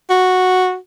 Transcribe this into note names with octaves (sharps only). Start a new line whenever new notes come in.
F#4